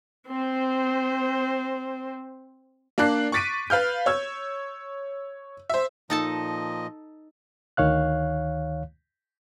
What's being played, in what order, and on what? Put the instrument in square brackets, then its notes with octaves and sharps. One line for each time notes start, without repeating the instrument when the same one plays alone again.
[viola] C4 C5
[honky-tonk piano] A#3 D4 D5 F#6 C7
C#6 D6 A6 B6 D7 D#7
B4 F5 F6 G6
C#5 E6 G#6
C5 E5
[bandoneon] A#2 F3 D#5 [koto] D#4 A4 A5
[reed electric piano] D2 D#3 C#5 F5 F#6